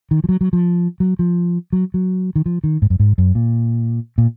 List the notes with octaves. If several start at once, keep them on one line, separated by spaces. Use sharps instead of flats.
D#3
F3
F#3
F#3
F3
F#3
F3
F#3
F#3
D#3
F3
D#3
G#2
F#2
G#2
F#2
A#2
A#2